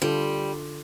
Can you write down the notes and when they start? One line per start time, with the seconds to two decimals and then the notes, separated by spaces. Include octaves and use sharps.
0.02 D3 G3 F4 A4